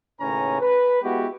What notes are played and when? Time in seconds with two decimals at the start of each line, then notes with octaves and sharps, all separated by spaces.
0.20 D#2 A2 C#3 C#4 B4 A#5
0.61 B4
1.02 G#3 B3 E4 F#4 G4